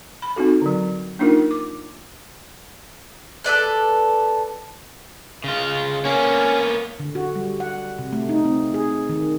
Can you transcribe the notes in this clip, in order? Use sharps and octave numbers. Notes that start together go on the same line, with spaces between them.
B5
C4 D#4 F#4 A4
D3 F#3
A#3 D4 D#4 F4 A#4
D6
A4 B4 D5 F#6
C#3 F4
A#3 B3 C#4
D3
F#4
G3
F#5
C3
A3
D#4
C4
G#4
D#3